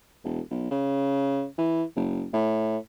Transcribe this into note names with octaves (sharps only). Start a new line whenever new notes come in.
E1
B1
C#3
E3
F#1
A2